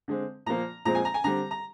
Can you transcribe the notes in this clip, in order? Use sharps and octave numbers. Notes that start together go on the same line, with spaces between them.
D3 G#3 C4
A#2 F3 A#3 A#5
A#2 F3 G#3 C4 A#5
G#5
A#5
G#5
D3 G3 C4 A#5
A#5